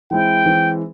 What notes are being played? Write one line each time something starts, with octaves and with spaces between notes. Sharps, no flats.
E3 G#3 C4 E4 G5
E3 G#3 C4 E4